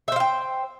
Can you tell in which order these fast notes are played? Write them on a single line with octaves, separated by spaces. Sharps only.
E5 C5 F5 G5